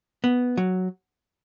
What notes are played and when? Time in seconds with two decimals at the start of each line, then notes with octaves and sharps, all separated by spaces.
0.24 B3
0.57 F#3